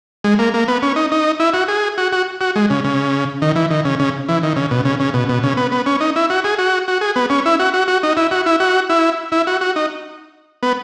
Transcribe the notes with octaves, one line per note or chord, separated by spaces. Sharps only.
G#3
A#3
A#3
B3
C#4
D#4
D#4
E4
F#4
G#4
F#4
F#4
F#4
G#3
C#3
C#3
D#3
E3
D#3
C#3
C#3
E3
D#3
C#3
B2
C#3
C#3
B2
B2
C#3
B3
B3
C#4
D#4
E4
F#4
G#4
F#4
F#4
G#4
B3
C#4
E4
F#4
F#4
F#4
D#4
E4
F#4
E4
F#4
E4
E4
F#4
F#4
D#4
B3